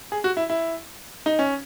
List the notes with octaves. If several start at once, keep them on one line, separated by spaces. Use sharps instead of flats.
G#4
F#4
E4
E4
D#4
C#4